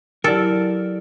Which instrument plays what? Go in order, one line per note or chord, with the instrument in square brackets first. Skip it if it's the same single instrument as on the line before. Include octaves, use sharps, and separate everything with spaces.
[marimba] F#3 E4 G4 [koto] A4 [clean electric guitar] A#4 D5